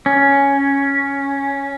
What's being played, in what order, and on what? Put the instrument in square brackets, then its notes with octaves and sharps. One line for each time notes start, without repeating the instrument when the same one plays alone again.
[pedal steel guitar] C#4